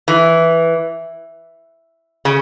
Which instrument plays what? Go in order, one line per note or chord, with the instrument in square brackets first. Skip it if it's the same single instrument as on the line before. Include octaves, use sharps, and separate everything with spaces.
[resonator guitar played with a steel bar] E3
C#3